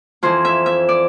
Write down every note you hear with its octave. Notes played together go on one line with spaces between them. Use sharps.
F2 E3 C5
E5
E5
D5